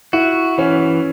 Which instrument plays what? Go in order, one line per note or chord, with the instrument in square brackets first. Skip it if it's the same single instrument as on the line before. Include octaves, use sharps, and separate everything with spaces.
[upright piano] E4 [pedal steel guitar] F#4
[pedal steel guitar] E3 [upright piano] C#4